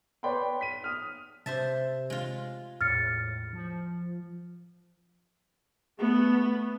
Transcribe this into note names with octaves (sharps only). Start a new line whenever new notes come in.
B4 C#5 D5 G5 B5 C6
B6 D#7
D#6 F6
C3 C5 E5 A5
G#3 F4
E2 A2 F6 A6 C#7
F3
A3 B3